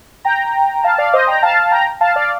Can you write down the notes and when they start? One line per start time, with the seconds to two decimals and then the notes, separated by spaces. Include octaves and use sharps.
0.25 G5 A#5
0.84 F5 A5
0.98 D5 F5
1.13 C5 D#5
1.27 G5 A#5
1.42 F5 A5
1.71 G5 A#5
2.01 F5 A5
2.16 D5 F5